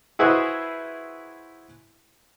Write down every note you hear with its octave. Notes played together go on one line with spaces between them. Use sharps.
E4 F#4 G#4 B4 C5 D#5